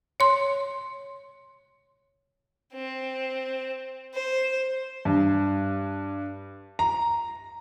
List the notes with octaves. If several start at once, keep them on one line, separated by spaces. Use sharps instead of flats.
C#5 C6
C4
C5
G2
A#5